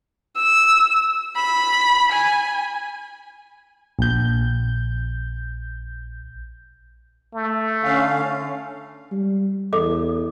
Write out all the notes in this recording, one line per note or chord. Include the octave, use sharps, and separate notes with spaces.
E6
B5
G#5
A#1 G6
A3
D3 C#4 F5
G3
E2 A4 D#5 D6